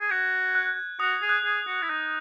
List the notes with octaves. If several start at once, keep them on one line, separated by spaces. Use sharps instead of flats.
G#4
F#4 G#6
F#6
F#4 D#6
G#4
F#6
G#4
F#4
E4
D#4